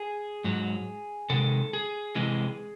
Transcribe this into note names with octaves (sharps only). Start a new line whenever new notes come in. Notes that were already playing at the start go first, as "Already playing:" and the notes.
Already playing: G#4
G#2 F#3
C3 D#3 G#3 A4
G#4
C3 E3 G#3